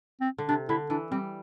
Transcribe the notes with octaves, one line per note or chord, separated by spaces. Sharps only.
C4
D3
C3 D4
D3 E4
E3 D4
G3 C4